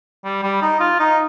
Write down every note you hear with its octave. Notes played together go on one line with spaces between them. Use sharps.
G3
G3
D#4
F4
D#4